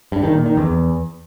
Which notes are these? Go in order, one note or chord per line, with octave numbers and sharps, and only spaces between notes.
G2
D#3
A#2
D#3
E2